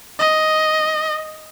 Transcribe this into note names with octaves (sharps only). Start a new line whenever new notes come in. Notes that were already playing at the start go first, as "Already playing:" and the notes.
D#5